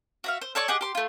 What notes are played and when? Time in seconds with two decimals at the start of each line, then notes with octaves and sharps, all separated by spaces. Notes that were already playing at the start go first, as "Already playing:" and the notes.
0.24 F#4 E5 F5
0.42 C5
0.55 A4 C#5 D5 C#6
0.68 G4 G#4 D#5 F#5
0.81 G4 C6
0.95 A3 F4